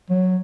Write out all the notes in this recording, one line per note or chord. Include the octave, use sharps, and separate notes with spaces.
F#3